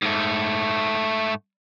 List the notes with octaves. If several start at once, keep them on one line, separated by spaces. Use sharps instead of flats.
G#2 A3